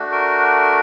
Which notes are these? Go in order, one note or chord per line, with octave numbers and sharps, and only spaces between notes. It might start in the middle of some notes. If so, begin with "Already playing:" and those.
Already playing: A3 D4 F#4
A#4